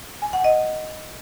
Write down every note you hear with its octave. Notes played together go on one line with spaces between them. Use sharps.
G#5
F#5
D#5